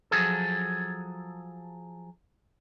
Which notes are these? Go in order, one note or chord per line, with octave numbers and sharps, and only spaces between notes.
F3 F#3 G#4 A4